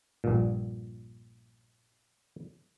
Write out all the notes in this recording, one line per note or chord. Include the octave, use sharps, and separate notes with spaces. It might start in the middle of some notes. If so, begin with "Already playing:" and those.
A#1 G2 A#2